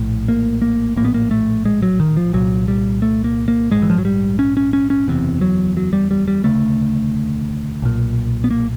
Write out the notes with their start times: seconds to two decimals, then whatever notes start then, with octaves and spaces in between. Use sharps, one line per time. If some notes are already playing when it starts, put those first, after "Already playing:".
Already playing: A#1 A2
0.28 A#3
0.62 A#3
0.96 A#1 A2 A#3
1.05 B3
1.14 A#3
1.31 A3
1.65 G#3
1.82 F#3
2.00 D#3
2.17 F3
2.33 C2 A#2 F#3
2.68 G3
3.02 A3
3.24 A#3
3.48 A#3
3.71 A#1 G#2 G#3
3.82 E3
3.90 F3
3.98 F#3
4.05 G3
4.39 C#4
4.57 C#4
4.73 C#4
4.90 C#4
5.08 F#1 E2 C3
5.41 F#3
5.77 F#3
5.93 G3
6.11 G3
6.28 G3
6.44 E1 D2 C#3 A3
7.82 B1 A#2
8.44 B3
8.51 A#3